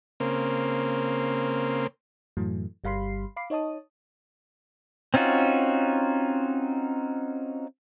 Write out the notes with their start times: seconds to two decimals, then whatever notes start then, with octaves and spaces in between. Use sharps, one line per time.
0.20 C#3 A#3 C4
2.37 F#2 A2 E3 F#3 A3
2.84 G1 G3 F5 B5 C6 C7
3.36 F5 B5 D6 C7
3.50 D#4 C#5 D#5 A5 D#6
5.14 C4 C#4 D#4 F4 F#4